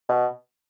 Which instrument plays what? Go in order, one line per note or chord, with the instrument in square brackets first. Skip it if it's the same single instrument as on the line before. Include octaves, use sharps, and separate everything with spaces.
[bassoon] B2